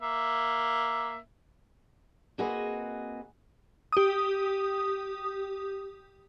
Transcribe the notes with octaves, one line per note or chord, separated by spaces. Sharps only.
A#3 E5
A#3 C4 F#4 G#4 B4 D#5
G4 D#6